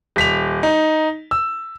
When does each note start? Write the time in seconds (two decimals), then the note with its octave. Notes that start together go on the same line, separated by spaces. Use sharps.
0.16 D#1 B6 F7
0.63 D#4
1.31 E6